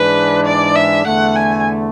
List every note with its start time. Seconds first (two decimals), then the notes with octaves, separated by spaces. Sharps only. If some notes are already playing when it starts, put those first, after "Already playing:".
Already playing: G#2 E3 G#3 D4 B4
0.46 D5
0.76 E5
1.06 E2 D3 A3 F#5
1.36 G#5